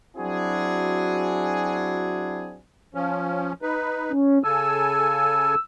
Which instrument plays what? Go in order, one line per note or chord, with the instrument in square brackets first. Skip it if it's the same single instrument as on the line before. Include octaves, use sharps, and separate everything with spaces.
[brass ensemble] F#3 C4 D4 E4 F#4 G#4
[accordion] F3 C#4
D#4 B4
[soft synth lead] C#4
[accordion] C#3 A4 G#5 [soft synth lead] E6